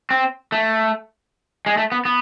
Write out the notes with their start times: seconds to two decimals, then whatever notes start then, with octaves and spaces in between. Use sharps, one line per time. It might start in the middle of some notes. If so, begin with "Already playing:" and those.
0.10 C4
0.52 A3
1.66 G#3
1.77 A3
1.92 B3
2.05 B3